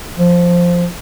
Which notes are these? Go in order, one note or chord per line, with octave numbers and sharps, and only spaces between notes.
F3